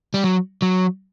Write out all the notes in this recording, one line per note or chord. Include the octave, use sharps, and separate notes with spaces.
G3
F#3
F#3